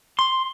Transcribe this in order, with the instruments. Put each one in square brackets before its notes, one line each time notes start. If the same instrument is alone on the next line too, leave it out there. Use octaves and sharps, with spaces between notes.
[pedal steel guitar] C6